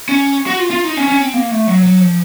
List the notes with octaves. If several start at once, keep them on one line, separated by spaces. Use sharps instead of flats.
C#4
F#4
F4
F4
D#4
C#4
C#4
C4
A#3
A3
F#3
F#3
F3